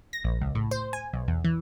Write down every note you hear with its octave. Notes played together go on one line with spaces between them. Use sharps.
A#6
A#1
C#2
A2
C5
G#5
B1
E2
E3